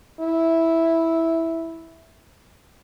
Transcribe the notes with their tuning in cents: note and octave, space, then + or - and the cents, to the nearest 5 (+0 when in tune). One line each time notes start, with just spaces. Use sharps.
E4 -5